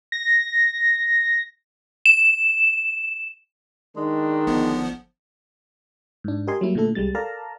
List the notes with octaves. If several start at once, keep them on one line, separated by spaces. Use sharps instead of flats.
A#6
E7
D#3 G#3 D4
G1 F3 B3
G#2 D4
G4 A#4 D#5 G#5 C6
F#3 G3 A#3 E4
A#2 D3 A3 E4 A4
C2 G3 G#3 A6
A4 A#4 D5 F5 A5 A#5